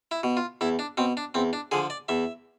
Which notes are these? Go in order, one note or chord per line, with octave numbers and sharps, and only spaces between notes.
E4
B2
F4
E2 E4
D4
B2 C4
D4
E2 C4
D4
D3 F3 G#4
D5
E2 E5